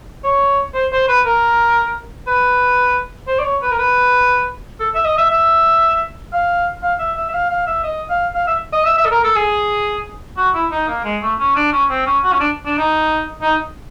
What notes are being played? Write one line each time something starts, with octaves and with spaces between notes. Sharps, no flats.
C#5
C5
C5
B4
A#4
B4
C5
D5
C#5
B4
A#4
B4
A4
E5
D#5
E5
E5
F5
F5
E5
E5
E5
F5
F5
E5
D#5
F5
F5
E5
D#5
E5
E5
A4
A#4
A4
G#4
F#4
E4
D#4
A#3
G#3
A3
C#4
D4
C#4
C4
C#4
F#4
C#4
D4
D4
D#4
D#4